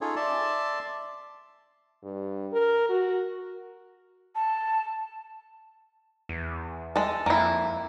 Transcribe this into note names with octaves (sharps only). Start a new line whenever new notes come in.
C#4 D#4 F4 G#4 A4 C#5
D5 E5 A5 C6
G2
A#4
F#4
A5
E2
G#3 A4
F2 A#3 E4